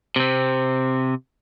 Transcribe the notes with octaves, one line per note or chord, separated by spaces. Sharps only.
C3 C4